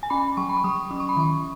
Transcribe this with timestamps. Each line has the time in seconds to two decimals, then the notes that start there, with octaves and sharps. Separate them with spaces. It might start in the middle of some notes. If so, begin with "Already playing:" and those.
0.03 G#5
0.10 C#4 B5
0.37 F#3 C#6
0.49 B5
0.57 C#6
0.64 F#3 D#6
0.91 C#4 D#6
1.00 C#6
1.09 B5
1.17 D#3 C#6